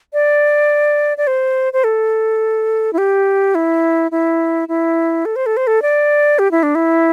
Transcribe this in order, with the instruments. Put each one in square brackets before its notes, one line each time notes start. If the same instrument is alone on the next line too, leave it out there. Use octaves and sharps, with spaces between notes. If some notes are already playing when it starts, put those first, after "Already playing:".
[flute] D5
D5
C5
C5
A4
E4
G4
E4
E4
E4
A4
C5
A4
C5
A4
D5
G4
E4
D4
E4